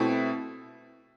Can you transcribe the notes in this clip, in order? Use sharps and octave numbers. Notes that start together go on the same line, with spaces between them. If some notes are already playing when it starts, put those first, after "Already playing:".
Already playing: B2 A3 C4 E4